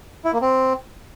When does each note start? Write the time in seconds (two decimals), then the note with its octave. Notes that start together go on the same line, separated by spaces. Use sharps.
0.25 E4
0.33 A#3
0.41 C4